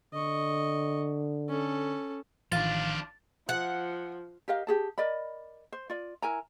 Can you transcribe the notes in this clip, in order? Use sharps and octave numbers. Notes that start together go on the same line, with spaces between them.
D3 D#5 C#6
C#4 A4
A1 D#3 F3 D4 F4 F5 A6
F3 F#5
G4 A#4 D#5 F5
G4 G#4 A5
A#4 D5 D#5 B5
C5
F4 D5
E4 A#4 G#5 A#5